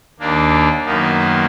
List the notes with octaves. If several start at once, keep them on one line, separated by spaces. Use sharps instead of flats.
D#2 A#3 D4
F#2 D#3 A#3 B3